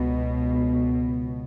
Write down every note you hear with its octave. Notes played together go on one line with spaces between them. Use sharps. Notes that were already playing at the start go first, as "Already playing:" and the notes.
Already playing: C#2 B2